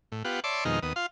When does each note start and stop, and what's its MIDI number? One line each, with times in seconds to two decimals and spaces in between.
0.12 0.23 45
0.25 0.40 59
0.25 0.40 65
0.25 0.40 67
0.25 0.40 78
0.44 0.64 73
0.44 0.64 74
0.44 0.64 76
0.44 0.64 81
0.44 0.64 84
0.44 0.64 86
0.65 0.80 41
0.65 0.80 47
0.65 0.80 51
0.65 0.80 56
0.65 0.80 63
0.65 0.80 89
0.83 0.93 39
0.83 0.93 59
0.83 0.93 87
0.96 1.06 65
0.96 1.06 77
0.96 1.06 84